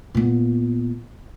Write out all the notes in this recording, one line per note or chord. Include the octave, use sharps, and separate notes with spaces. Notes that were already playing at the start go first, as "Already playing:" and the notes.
A#2 B3